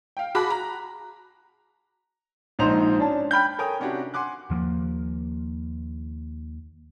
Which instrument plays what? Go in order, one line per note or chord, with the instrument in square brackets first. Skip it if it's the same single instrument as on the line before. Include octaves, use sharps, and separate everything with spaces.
[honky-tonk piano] F5 G5
F#4 G#4 A5 B5 D6 F#6
A#5
[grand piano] A#1 G#2 D#4 C5 A#5 F7
C#4 D4 A5
G5 B5 F6 G6
[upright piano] A4 A#4 C#5 G5 G#5 D#6
C3 C#4 D4 F#4 G4
F#5 G#5 C6 D6 F#6
[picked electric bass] D#2 F3 A3 A#3